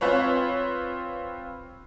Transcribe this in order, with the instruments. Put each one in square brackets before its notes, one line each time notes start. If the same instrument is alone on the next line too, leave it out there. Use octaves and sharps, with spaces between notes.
[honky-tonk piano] C4 F4 B4 C#5